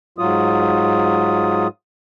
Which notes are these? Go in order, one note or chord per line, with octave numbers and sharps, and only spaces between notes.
G#2 F#3 F4 D#6